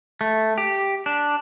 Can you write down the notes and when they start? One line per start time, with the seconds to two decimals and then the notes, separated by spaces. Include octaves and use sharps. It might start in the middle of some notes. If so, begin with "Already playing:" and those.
0.21 A3
0.58 G4
1.06 D4